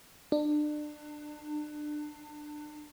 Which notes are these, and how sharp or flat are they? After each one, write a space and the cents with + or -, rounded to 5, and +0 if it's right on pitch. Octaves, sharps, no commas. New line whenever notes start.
D4 +30